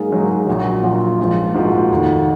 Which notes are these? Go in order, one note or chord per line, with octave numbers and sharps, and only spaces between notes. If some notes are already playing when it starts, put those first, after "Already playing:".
Already playing: G#2 F#3 A#3 D#4 G#4
G#2 F#3 A#3 D#4
A#1 A#2 F#3 F#4
A#1 A#2 F#3 F4
A#1 G#2 F3
A#1 G#2 F3 F#4
F1 D#2 D#3